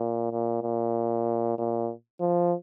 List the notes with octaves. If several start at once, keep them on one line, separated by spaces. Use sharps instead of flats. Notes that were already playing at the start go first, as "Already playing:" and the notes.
Already playing: A#2
A#2
A#2
A#2
F3